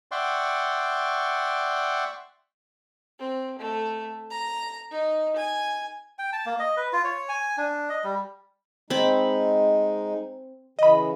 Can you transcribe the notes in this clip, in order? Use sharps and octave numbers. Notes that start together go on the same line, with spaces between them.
D5 E5 F#5 G5 C6 C#6
C4
A3
A#5
D#4
G#5
G5
A5
A#3
D#5
B4
F4
C#5
G#5
D4
D#5
G3
G#3 C4 D#4 B5
C#3 E3 D#5 B5